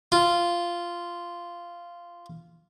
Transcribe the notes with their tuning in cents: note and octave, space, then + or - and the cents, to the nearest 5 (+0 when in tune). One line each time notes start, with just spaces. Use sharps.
F4 -10